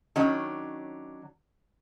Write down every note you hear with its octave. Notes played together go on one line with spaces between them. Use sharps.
D#3 F#3 C#4 D4